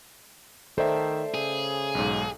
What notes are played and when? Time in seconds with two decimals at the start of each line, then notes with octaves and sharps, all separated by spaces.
0.78 D#3 A4 C5 D5 E5
1.34 C#3 G#4
1.95 B1 G#2